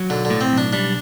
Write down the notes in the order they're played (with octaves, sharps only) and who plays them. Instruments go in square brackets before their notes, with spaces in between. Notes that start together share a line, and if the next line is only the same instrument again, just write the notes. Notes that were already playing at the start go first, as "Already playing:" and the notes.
Already playing: [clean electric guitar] F#3
[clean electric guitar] B1 [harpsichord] D3
[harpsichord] D3
[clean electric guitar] A2
[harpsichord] C4
[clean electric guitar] B1
[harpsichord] D4
[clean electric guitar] G3 [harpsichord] D4